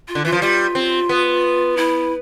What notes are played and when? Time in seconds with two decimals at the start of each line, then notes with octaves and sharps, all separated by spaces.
0.08 F4
0.15 D3
0.25 E3 F4
0.32 F3
0.41 G3 F4
0.75 C4
1.09 B3
1.77 E4